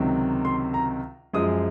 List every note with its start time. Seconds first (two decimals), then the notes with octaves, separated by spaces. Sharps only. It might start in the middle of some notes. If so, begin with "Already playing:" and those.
Already playing: C#2 C3 D#3 F#3
0.45 C6
0.74 A#5
1.33 F#2 F3 G#3 D#6